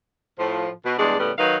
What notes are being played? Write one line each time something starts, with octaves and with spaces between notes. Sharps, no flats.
A2 F3
B2
E2 G2 G#3 D4 D5
A2 C#3 G3 B3
D#3 F#3 D#4 B4 F5